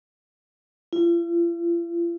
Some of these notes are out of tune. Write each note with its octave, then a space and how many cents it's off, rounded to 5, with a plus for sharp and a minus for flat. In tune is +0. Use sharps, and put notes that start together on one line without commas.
F4 -45